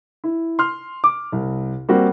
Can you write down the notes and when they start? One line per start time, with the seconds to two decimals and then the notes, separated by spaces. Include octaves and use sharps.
0.24 E4
0.59 C6 F6
1.04 D6
1.32 C2
1.89 G3 A#3 C4 F#4